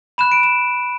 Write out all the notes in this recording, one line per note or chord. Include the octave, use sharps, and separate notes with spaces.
B5 F#6 E7
D7
E7